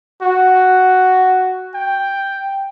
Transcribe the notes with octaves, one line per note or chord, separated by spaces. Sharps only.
F#4
G5